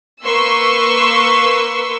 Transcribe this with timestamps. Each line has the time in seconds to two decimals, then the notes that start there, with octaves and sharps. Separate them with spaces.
0.24 A#3 B4 C6 C#6 E6